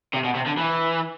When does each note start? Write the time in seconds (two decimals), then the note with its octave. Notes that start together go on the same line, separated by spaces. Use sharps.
0.13 C3
0.24 B2
0.35 C3
0.47 D3
0.59 E3